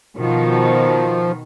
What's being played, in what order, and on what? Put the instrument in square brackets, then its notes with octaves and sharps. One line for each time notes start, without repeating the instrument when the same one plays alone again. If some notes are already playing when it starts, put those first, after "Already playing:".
[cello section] B2 D#3 [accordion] F3